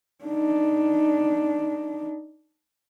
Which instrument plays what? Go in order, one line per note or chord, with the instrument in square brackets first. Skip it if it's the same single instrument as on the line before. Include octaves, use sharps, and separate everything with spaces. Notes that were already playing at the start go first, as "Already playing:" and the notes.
[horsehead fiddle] D4 D#4